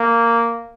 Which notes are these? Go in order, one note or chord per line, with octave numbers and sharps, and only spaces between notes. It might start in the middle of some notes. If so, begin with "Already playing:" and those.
Already playing: A#3